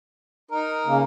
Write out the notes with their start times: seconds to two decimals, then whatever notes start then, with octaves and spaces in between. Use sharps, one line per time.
0.51 D#4 A#4
0.86 C#3 A#3